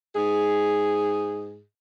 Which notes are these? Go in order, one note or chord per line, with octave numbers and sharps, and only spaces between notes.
G#2 G#4